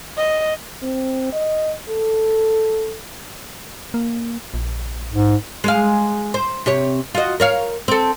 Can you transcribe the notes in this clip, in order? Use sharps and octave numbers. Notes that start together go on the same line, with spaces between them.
D#5
C4
D#5
A4
A#3
A#1
G#2
G#3 G#4 F5
C5
C3 G4 C#5
F4 F#4 D#5
A#4 C#5 F5
C4 A4